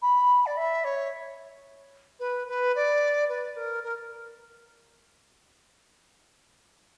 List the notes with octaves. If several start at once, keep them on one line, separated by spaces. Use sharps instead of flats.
B5
D5
E5
C#5
B4
B4
D5
B4
A#4
A#4